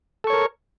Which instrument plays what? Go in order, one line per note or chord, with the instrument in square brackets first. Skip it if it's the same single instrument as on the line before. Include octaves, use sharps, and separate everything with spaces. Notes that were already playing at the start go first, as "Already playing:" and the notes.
[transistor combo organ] A4
C#6
C#5
A#4